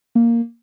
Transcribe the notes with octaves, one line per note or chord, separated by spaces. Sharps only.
A#3